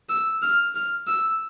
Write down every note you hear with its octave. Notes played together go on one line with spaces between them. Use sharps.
E6
F6
F6
E6